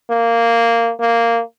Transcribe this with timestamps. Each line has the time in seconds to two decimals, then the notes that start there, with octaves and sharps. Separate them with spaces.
0.10 A#3
1.00 A#3